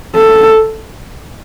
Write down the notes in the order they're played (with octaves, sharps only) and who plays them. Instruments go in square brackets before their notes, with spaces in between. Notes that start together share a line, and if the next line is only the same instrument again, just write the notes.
[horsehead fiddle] A4